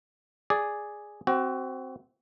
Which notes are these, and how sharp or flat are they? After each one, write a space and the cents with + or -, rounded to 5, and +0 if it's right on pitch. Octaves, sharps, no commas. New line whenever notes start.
G#4 +0 D5 +0
C4 +0 F#4 +25